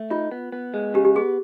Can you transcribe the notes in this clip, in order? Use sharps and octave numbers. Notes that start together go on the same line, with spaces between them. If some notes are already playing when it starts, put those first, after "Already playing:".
Already playing: A3
D#4 F4
B3
B3
G#3
C#3 G4
G4
B3 G#4